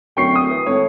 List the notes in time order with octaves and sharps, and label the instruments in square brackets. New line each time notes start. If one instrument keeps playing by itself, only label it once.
[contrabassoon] D1 [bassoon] F#2 [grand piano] G5 C#6 C7
[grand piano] D#6
[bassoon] E3
[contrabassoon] G#1 [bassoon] A2 [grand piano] C#5